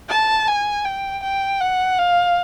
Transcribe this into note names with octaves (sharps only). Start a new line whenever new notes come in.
A5
G#5
G5
G5
F#5
F5